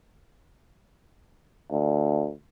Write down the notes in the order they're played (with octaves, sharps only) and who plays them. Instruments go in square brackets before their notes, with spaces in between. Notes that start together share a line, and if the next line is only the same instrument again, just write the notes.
[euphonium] D2